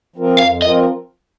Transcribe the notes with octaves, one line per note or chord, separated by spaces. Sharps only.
F3 C4 F4 A#4
F2 F5
F3 C4 F4 A#4 D#5